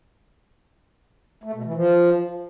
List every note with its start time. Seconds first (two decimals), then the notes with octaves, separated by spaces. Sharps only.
1.44 A3
1.54 B2
1.64 E3
1.74 F3